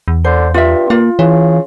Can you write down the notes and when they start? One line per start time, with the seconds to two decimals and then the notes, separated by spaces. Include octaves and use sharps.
0.08 E2
0.24 D3 C5
0.54 G2 F4 E5
0.90 A#3 F4
1.19 C#3 E3